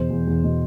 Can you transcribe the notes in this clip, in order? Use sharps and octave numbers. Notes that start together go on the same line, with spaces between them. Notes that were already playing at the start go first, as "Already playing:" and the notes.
Already playing: E2 B2 C5
E2
E2
B2